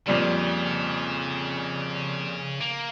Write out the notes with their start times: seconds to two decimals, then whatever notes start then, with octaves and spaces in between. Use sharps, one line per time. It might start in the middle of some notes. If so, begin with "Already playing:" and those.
0.08 F2 A#2 C#3 G3
2.61 A#3